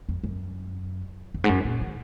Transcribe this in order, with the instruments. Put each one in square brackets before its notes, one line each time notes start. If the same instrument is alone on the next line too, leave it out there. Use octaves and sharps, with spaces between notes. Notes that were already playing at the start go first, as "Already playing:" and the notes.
[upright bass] F2
F#2
F2
G#2
F#2
A#2
D#3